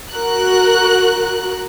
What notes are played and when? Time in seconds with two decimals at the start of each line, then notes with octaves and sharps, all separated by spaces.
0.12 F#4 A#4 F#6